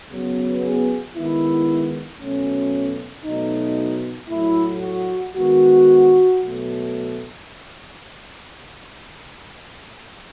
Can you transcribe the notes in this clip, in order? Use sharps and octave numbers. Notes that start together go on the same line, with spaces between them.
C#3 F#3 B3
G#4
D#3 G#3 B3 E4
B2 F#3 A3 C#4
B2 F#3 A3 D#4
A2 F#3 A3 E4
F#4
D#3 G#3 B3 F#4
B2 F#3 A3